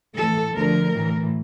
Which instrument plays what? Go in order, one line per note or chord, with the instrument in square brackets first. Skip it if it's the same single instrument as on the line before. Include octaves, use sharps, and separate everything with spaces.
[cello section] A2 E3 A4
D2 D3 F3 A#4
A2 E3